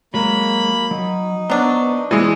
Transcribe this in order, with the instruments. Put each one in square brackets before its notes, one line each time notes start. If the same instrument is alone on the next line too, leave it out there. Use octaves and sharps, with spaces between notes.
[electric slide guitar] F#3 G#3 [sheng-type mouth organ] A#3 B5
[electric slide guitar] F#3 [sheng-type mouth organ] D#4
[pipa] F#3 D4 [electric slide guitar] B3 B4 C5
[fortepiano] E3 G#3 [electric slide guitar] G3 E4